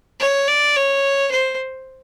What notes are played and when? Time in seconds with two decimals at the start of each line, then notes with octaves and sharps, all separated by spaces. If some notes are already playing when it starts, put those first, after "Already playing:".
0.20 C#5
0.48 D5
0.76 C#5
1.31 C5